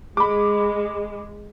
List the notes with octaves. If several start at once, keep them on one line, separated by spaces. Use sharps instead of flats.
G#3 B5 D6